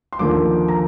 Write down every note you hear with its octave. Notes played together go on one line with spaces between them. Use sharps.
C6
D#2 D3 F3 A#3 D6
A#5